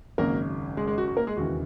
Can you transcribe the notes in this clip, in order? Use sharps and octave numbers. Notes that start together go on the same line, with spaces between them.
G#1 F#2 C#3 A#3 A#4
G#3 G#4
G#3 G#4
F#4
F#4
A#3 A#4
G#3 G#4
E1 D#2 C#3 E3 F#4